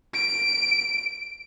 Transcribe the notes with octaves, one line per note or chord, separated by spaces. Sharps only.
D7